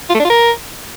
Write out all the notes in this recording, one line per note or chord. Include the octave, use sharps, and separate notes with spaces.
F4
A3
D4
F4
A#4